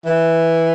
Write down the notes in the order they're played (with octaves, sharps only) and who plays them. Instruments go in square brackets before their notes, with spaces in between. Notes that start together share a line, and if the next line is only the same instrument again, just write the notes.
[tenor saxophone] E3